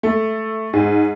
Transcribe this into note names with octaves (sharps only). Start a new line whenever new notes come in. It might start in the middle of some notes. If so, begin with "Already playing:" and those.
A3
G#2